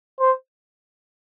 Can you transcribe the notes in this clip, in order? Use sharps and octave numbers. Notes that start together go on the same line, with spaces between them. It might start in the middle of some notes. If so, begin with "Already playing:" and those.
C5